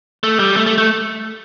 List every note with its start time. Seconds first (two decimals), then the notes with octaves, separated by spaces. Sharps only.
0.24 A3
0.39 G3
0.56 A3
0.67 A3
0.78 A3